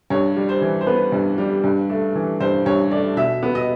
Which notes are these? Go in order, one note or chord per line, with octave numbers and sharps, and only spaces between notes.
G2 C#5
G3
C5
E3
C5
B3 B4
G2
G3
G2
A3
E3
G2 C5
G2 C#5
A3 D5
B2 E5
B3
D#5